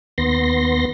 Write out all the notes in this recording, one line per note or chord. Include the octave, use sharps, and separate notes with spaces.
D#2 B3 C6 A#6